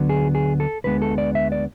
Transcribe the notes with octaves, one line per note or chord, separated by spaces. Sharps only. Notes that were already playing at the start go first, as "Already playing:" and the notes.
Already playing: D2 D3 F#3 B3
G#4
G#4
A4
D2 D3 G#3 B3 B4
A4
D5
E5
D5